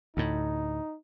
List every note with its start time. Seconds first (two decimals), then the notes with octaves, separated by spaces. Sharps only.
0.17 D2 A2 D#4